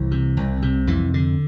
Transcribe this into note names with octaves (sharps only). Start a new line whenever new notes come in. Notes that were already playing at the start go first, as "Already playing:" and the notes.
Already playing: C2 E3
C3
C2
C3
F2 E3
D3